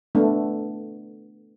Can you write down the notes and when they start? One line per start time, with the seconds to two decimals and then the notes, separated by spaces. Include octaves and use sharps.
0.15 A3 B3 D4